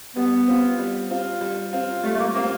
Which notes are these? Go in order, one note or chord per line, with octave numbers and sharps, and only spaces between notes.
G3 B3
C4 F4
G3
C4 F4
G3
C4 F4
G3 A3
A3
A#3
A#3 C4 F4